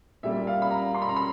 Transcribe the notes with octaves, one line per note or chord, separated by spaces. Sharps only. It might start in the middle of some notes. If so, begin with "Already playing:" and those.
A#2 G3 E5
F5
B5
A#5
C6
B5
A#5
B5